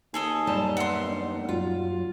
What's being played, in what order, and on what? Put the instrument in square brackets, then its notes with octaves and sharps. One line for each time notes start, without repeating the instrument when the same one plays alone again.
[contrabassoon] D#2 [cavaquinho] G#4 A4 D#5
[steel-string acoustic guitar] F#2 G3 A5
[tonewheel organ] B3 E5 [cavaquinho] F#5 C6
[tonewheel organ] B3 D4 D#4
[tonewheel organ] F#2 F#3 [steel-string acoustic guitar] F4